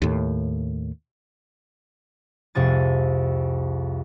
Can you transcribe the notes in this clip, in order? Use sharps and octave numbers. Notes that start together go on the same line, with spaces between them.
D#2 A2
C2 F2 C3 G#4 A6